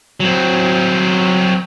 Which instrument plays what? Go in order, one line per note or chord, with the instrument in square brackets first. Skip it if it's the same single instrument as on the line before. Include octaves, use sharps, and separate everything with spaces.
[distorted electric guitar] F#3 C4